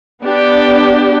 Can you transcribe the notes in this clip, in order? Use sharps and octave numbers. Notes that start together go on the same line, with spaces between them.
B3 D4 G4